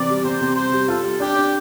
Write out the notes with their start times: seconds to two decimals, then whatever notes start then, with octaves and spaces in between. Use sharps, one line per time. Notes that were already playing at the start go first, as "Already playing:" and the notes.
Already playing: C3 E3 C4 D5
0.09 G3
0.24 C3 C5
0.41 C3
0.56 G3 C5
0.72 G3
0.88 F4 A4
1.04 G3
1.20 D4 G4
1.36 D4